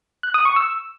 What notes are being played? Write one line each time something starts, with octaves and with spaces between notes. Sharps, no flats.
F#6
D#6
C#6
E6